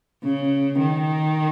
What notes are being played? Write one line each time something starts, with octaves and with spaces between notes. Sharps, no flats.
C#3
D#3